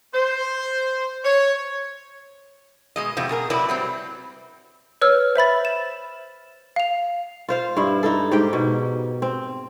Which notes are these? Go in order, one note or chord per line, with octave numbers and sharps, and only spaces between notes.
C5
C#5
B2 G#3 D#5
E2 A2 C3 F3
B2 G#4 A#4
A2 C3 F#3 E4 B4 D5
F#3 G3 C4
B4 C#5 E6 F6
C5 E5 B5 A6
E7
F5 F7
F4 C5 F5
G2 E4
D#4 E4 A4
G#2 G4 G5
B2
C4